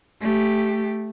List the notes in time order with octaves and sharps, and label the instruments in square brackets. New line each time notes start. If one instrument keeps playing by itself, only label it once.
[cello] A3 G4